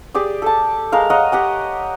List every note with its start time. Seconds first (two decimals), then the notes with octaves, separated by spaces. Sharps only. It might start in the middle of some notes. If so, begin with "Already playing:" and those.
0.14 G4 G#4 D5
0.42 A4 A5
0.92 G#3 A#4 F5
1.10 A#4 C#5 D#5 F#5
1.32 G4 F#5 G#5